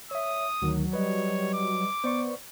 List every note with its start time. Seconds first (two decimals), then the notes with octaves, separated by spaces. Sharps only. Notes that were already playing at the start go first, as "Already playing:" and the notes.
0.11 C#5 E5 D#6
0.62 D2 D#3 F#3
0.93 G3 B4 C#5 D#5
1.53 D6
2.04 B3 C5 D5 C#6